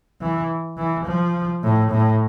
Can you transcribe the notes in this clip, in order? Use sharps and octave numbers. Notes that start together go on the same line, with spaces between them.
E3
E3
F3
A2
A2